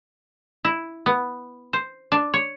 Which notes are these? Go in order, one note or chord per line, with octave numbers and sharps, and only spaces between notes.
E4
B3
C5
D4
C#5